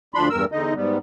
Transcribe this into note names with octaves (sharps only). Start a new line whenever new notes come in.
D2 F3 D4 B5 C6
E2 G2 A#4 E6
E2 D3 D#4 D#5
G#2 G3 B3